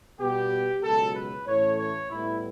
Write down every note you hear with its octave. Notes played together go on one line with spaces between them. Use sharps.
B2 G3 B3 G4
C#2 B2 F#3 A4
B4
A2 E3 A3 C#4 C#5
C#5
A2 G3 B3 E4